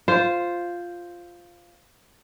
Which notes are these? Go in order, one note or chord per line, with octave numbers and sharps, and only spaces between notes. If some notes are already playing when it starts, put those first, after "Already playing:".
F4 C5